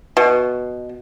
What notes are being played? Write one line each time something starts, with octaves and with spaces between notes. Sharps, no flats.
B2